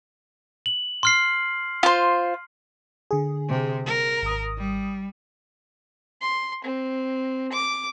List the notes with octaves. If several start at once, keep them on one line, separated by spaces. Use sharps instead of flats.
F#7
C6 F6 C7
F4 C5
D3 G#4
C3
A#4
G#1 D#6
G3
C6
C4
D6